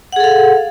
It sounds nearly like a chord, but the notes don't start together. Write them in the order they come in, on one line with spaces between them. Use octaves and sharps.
F#5 G#4 A4 F5